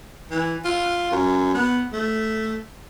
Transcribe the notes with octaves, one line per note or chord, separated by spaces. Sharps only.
E3
F4
F#2
B3
A3